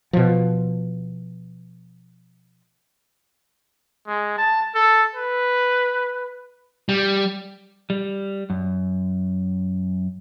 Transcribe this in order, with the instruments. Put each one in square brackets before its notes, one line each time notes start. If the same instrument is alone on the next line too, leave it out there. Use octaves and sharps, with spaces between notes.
[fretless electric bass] B2 F3
[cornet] G#3
A5
A4
B4
[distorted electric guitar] G3
[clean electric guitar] G3
F#2